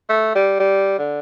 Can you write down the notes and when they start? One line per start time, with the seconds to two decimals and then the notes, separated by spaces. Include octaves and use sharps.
0.09 A3
0.35 G3
0.60 G3
0.99 D3